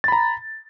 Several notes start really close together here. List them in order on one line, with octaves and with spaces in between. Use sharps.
A6 B5 A#5